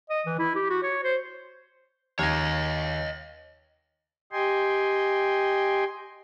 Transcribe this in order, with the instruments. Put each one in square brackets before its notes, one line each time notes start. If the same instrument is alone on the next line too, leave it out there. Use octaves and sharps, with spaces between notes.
[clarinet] D#5
E3
E4
G4
F#4
C#5
C5
[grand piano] D#2 G#6 [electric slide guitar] C#5 D#5
[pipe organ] G4 D#5 G5 G#5 C6